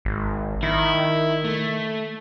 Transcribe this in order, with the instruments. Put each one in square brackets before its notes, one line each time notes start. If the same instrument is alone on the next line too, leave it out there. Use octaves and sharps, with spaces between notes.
[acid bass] G#1
[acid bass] D#3 [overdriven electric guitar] E4
[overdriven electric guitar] A3